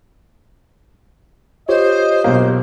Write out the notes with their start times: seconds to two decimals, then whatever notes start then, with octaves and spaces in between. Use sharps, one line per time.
1.69 F4 G4 C5 C#5 D#5
2.24 B1 A#3